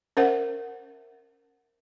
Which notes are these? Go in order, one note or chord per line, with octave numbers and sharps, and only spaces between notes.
C#4 A#4 C5 E5 F#5